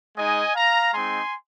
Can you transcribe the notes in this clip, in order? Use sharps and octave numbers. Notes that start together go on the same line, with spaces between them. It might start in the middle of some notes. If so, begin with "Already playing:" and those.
G#3 D#4 D#5 G#5
F5 A#5
G#3 C4 D#4 G#5 C6